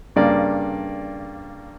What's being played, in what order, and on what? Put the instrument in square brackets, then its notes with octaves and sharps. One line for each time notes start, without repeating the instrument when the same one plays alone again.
[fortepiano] G2 C#3 A#3 D5